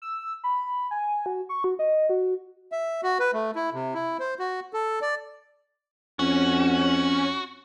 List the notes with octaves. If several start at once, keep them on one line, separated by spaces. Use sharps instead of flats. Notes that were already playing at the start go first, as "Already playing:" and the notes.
E6
B5
G#5
F#4
C#6
F#4
D#5
F#4
E5
F#4
B4
A3
E4
C3
E4
C5
F#4
A4
D5
F2 C#4 F#4